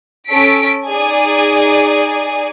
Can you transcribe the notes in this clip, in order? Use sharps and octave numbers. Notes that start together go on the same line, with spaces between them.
C#4 A4 B6 D7
D#4 G#4 D5 G#5